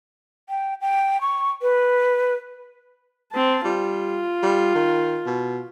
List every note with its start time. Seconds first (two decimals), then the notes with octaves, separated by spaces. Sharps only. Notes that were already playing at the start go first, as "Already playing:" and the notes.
0.49 G5
0.81 G5
1.21 C#6
1.62 B4
3.32 C4 A5
3.65 G3 F4
4.43 G3
4.75 D#3
5.26 B2